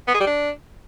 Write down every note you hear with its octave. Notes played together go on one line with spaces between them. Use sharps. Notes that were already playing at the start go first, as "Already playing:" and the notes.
B3
G#4
G3
D4